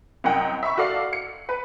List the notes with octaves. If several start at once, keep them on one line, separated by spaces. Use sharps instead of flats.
C2 F#2 D#5 F#5 G5
E5 B5 C#6
F#4 A4 D5 F5
C#7
B4